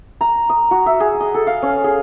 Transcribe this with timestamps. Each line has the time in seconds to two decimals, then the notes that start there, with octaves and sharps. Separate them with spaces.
0.21 A#5
0.50 D#6
0.71 F#4
0.86 E5
1.00 G#4
1.20 D#5
1.34 A4
1.47 F5
1.62 C#4
1.84 G#4